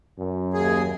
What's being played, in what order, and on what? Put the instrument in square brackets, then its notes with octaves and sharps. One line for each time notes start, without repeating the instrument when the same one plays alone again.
[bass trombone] F#2
[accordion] D#2 G#4